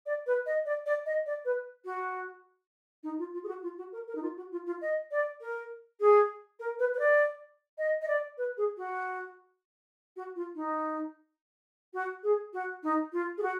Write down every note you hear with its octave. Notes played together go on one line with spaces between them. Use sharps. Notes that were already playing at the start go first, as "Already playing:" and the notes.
D5
B4
D#5
D5
D5
D#5
D5
B4
F#4
D#4
F4
F4
G#4
F#4
F4
F#4
A#4
A#4
D#4
F4
F#4
F4
F4
D#5
D5
A#4
G#4
A#4
B4
B4
D5
D#5
D#5
D5
B4
G#4
F#4
F#4
F4
D#4
F#4
G#4
F#4
D#4
F4
G#4
F#4